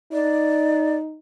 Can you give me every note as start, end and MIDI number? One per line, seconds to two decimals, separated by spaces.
0.13 1.19 63
0.13 0.96 74